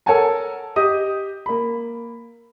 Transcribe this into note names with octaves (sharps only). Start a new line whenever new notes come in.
A4 A#4 C#5 F#5 G#5 A5
G4 D#5 D#6
A#3 B5